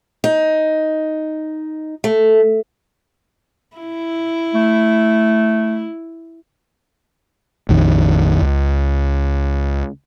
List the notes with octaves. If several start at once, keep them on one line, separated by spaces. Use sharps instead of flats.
D#4
A3
E4
A3
A#1 F2 D#3 F3
C#2